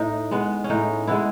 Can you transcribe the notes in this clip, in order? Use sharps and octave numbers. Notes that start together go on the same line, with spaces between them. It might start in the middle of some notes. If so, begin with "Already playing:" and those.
Already playing: A2 D#4
G#3 B3
C#4
A2 D#4
G#3 B3 E4